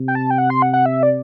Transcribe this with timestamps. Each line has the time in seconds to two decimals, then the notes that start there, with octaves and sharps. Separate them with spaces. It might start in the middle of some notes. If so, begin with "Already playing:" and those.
Already playing: C3
0.08 G5
0.15 A5
0.30 G5
0.38 F#5
0.50 C6
0.62 F#5
0.73 F#5
0.86 E5
1.03 D5